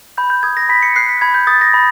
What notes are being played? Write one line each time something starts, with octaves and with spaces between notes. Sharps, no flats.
B5 G6
G6
D#6 G#6
A#6
B5 B6
C#7
F#6 C7
B6
B5 G#6
G6
D#6 A6
A#6
B5